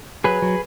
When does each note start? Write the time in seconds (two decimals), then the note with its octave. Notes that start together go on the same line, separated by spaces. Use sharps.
0.24 F#3 G#4 B4
0.42 F#3